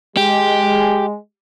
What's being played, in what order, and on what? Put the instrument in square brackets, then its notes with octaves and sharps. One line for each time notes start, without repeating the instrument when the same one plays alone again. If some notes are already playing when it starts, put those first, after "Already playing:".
[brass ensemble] G#3 [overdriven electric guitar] G4